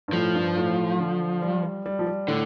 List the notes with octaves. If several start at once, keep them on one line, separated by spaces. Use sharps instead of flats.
G2
A2 F3
G2
A2
D3
G3
G3
G3
F3
G3
A2 D3